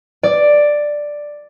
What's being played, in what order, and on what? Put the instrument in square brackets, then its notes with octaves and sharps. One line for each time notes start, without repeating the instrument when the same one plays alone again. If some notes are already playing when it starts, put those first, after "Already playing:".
[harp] D5